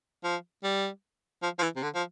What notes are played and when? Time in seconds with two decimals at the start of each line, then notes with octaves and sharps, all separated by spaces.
0.24 F3
0.64 G3
1.43 F3
1.59 F3
1.63 E3
1.76 C3
1.83 D3
1.95 F3